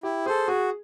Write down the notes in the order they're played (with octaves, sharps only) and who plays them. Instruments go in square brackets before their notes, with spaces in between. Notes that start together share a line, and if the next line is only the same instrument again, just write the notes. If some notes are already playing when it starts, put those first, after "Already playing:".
[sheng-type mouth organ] E4 [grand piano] G4
[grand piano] G#4 [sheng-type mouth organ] A4 C5
[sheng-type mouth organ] F#4 [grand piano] G#4